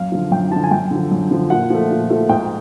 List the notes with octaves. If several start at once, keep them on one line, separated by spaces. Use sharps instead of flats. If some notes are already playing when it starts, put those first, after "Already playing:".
Already playing: F#2 F5
D3 F3
F#2 G5
D3 F3 A5
G#5
F#2 G5
D3 F3
F#2
D3 F3
A#2 F#5
F3 A3
A#2
F3 A3
G#2 G5